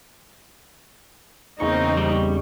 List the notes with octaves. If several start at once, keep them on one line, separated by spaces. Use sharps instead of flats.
E2 C#3 A#3 C4 D#4 C#6
G3